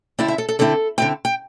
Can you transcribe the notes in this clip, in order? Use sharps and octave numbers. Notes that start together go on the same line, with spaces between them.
D3 C4 E4 D5
E5
A4
A4
D3 C4 E4 A4
D3 C4 E4 G5
G5